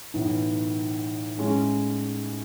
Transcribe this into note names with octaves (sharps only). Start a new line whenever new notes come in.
B1 A2 E3
A2 G#3 C#4